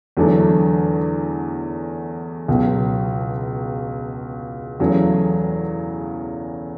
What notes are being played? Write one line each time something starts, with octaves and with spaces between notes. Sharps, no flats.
E2 D3 F#3 A3 D4
C#2 B2 F#3
E2 C#3 F#3 A3